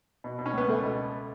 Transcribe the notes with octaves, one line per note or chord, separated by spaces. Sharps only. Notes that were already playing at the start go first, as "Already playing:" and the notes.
B2
B2
C#4
C#2 B3
C#2 A3
B2